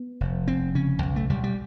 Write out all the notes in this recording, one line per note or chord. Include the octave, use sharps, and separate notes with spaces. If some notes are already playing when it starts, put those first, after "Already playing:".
Already playing: B3
F1
F1 C4
C#3 C#4
B1
A3
B1 G3
G3